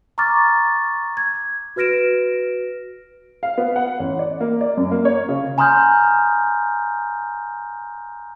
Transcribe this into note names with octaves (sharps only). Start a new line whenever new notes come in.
A#5 C#6 D6 F6 A6
G#6
F#4 B4 F6 A#6 D7 E7
F5
B3
F#5
A1
D5
A#3
D5
F#2
A#3
C#5
C#3
G#5 A#5 C6 D#6 F6 G6